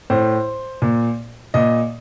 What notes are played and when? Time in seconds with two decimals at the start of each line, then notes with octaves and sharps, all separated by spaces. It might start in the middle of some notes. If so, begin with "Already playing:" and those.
0.10 A2 C5
0.82 A#2
1.54 A#2 D#5